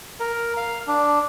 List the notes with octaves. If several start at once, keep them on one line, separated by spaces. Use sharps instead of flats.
A#4
F5
D4